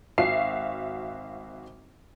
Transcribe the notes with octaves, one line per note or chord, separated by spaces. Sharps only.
G#1 F#4 E5 F5 C7